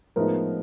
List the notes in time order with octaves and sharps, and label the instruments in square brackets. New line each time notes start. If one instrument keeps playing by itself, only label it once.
[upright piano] A2 F3 G#3 B3 D#4 A#4